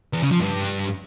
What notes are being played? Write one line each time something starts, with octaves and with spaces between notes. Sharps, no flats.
E2
C#3
F3
G2